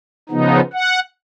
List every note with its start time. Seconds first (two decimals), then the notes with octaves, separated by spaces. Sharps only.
0.29 C#3 F3 B3 D#4
0.73 F#5